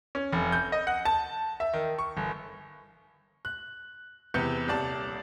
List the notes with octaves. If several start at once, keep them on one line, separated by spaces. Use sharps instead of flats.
C#4
F1
G6
D#5
F#5
A5
E5
D#3
C#6
G1
F#6
E2 C3 B4 G6 C#7
D#1 C2 D5 A5